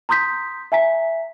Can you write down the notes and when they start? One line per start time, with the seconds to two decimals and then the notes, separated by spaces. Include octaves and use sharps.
0.09 A#5 C6 D#6 G6 B6
0.72 E5 G#5 A#5 B6